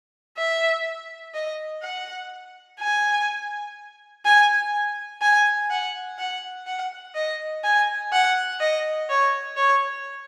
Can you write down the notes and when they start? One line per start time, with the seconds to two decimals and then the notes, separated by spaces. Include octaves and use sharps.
0.38 E5
1.34 D#5
1.83 F#5
2.80 G#5
4.25 G#5
5.22 G#5
5.71 F#5
6.18 F#5
6.67 F#5
7.15 D#5
7.64 G#5
8.13 F#5
8.60 D#5
9.10 C#5
9.57 C#5